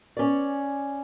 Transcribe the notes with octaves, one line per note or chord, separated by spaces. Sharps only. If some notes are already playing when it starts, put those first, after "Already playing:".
C#4 D5